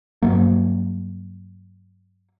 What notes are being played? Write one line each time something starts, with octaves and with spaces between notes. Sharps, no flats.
G2 F#3 A#3